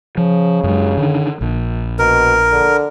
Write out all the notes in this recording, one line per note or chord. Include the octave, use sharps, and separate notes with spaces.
C#3 F3
F#2 F#3 G#3
D3 D#3
A#1
B2 A#4
D3